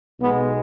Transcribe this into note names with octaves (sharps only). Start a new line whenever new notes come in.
B1 B2 G#3 B3